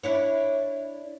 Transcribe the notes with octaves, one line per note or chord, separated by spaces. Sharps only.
D4 E4 C#5